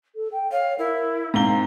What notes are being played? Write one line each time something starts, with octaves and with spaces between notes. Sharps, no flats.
A4
G5
C#5 F5
E4 A#4
G#2 C4 F5 A#5 G7